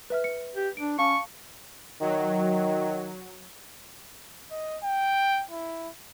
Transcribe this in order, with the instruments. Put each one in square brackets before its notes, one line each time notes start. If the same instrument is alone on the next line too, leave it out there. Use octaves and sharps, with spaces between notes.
[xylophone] B4 E5 F6
C#7
[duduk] G4
[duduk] D4 [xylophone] D7
[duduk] C#4 [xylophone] F5 A5 D6 [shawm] C#6
[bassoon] D#3 [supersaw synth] F#3
[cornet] D#5
G5
E4